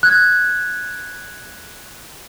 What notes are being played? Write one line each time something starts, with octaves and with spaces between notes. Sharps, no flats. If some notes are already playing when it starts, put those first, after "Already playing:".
F#6 G#6